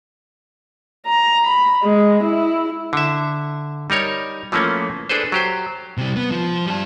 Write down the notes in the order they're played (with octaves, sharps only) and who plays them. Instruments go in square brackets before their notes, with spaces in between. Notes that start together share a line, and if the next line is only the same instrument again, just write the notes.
[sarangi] A#5
B5
G#3
E4
[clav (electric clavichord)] D3 E5
G3 D#4 A#4 C#5
E3 F3 A3 A#3 C#4
D4 G#4 A4 B4 C5
F#3 G4 C5
[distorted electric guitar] C3 G3
B3
F3
G3 A5